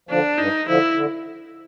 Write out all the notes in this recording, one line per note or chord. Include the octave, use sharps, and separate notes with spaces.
D3 F3 D4
G2 D#4
D3 F3 E4
D3